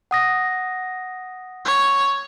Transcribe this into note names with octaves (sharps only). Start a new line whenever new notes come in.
F#5 D#6 A#6
C#5